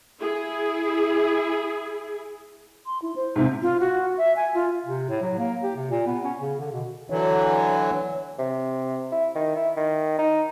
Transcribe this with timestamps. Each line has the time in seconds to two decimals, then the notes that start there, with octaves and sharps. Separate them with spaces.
0.21 E4 G#4
2.86 C6
3.02 E4
3.16 C5
3.36 G#2 C3
3.62 F4
3.80 F#4
4.18 E5
4.36 G#5
4.54 F4
4.85 C3
5.09 A2
5.22 F#3
5.38 A#3
5.63 G4
5.76 C3
5.91 A#2
6.07 B3
6.24 C#4
6.39 C#3
6.60 D3
6.72 B2
7.10 D3 E3 F#3 C#5
8.39 C3
9.12 E4
9.35 D#3
9.56 E4
9.77 D#3
10.18 D#4